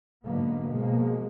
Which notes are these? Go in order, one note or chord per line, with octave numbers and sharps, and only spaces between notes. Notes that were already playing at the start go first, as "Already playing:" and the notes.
G#2 D3 F#3 A#3 B3
B2 F3 G#3 A#3